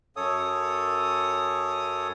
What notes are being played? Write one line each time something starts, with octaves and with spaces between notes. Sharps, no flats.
F#2 A4 C#5 D#6